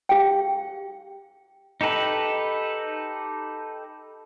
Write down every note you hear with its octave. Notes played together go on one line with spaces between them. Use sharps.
G4 F5 G5
D#4 G4 A4 B4